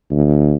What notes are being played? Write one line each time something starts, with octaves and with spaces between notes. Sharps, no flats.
D2